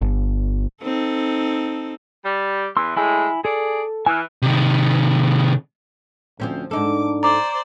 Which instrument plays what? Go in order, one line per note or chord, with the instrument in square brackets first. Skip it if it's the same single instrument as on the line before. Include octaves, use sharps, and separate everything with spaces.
[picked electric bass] G1
[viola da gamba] C4 D#4 A4
[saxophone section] G3
[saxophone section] E2 E3 [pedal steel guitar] C6 E6
[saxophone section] A2 G#3 [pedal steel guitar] E4 G#5 E6
[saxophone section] G#4 D5 [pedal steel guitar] A4
[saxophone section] E3 [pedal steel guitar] G#5 E6 F6
[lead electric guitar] C3 D#3
[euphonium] D2 [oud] F3 C4 C#4
[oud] G#2 D#4 A4 [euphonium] D4 [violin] D6
[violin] C5 D5 [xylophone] A#5 D6